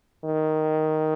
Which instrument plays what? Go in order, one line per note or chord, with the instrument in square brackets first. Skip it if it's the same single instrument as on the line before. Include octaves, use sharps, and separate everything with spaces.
[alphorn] D#3